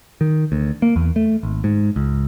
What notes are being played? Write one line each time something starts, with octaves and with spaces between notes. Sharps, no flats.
D#3
D2
A#3
E2
A3
G#1
G#2
C#2